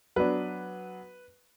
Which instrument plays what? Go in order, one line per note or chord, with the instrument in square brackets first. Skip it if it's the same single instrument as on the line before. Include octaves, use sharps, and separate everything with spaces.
[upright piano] F#3 B3 D4 B4